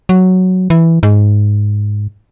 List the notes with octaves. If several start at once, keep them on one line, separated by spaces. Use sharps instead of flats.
F#3
E3
G#2